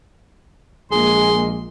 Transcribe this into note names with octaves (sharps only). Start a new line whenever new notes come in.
A#1 G#3 A#3 G#4 C6